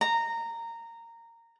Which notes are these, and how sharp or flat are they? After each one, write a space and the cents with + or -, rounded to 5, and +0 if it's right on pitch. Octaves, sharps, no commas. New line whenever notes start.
A#5 -15